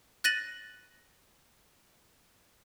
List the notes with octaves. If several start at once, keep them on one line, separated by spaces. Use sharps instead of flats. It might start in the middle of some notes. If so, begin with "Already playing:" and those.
F#6 A6 A#6 D#7 F#7